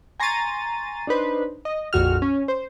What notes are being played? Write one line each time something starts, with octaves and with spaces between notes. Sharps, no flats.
G#5 A#5 C6 C#6 A6 D#7
D4 D#4 B4 C5
D#5
A#1 F2 F#4 F6
C#4
C5